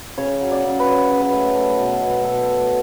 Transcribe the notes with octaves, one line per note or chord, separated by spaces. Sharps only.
C#3 C#5
F#3
D5
C#3
B4
F#3 C#5
C#3
B4
A3
A3
B2
B2
B2 A4
A3